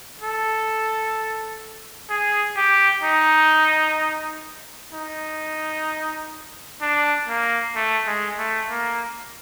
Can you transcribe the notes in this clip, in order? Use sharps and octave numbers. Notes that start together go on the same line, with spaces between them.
A4
G#4
G4
D#4
D#4
D4
A#3
A3
G#3
A3
A#3